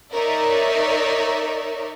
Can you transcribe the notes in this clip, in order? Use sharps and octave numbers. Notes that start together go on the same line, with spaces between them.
D#4 A#4 C#5 D5 E5